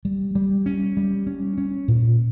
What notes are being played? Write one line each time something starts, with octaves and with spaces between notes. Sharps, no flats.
G3
G3
C#4
G3
C#4
C#4
A#2